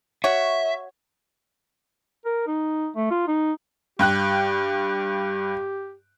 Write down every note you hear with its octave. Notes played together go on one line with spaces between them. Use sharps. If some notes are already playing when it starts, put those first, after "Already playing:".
F#4 C#5 E5
A#4
D#4
A3
F4
D#4
G2 G4 G5 F#6